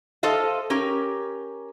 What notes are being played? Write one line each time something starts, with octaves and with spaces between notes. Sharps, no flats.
A4 C5 D#5 F5
C#4 G4 A#4